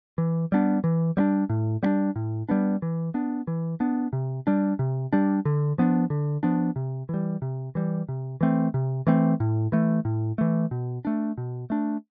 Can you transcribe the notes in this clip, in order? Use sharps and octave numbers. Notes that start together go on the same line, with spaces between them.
E3
G3 B3 D4
E3
G3 B3 D4
A2
G3 B3 D4
A2
G3 B3 D4
E3
B3 D4
E3
B3 D4
C3
G3 D4
C3
G3 D4
D3
F3 B3 D4
D3
F3 B3 D4
C3
E3 G3
C3
E3 G3
C3
E3 A3 C4
C3
E3 A3 C4
A2
E3 A3
A2
E3 A3
B2
A3 D4
B2
A3 D4